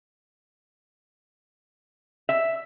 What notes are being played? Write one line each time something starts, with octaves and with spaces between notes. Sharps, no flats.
E5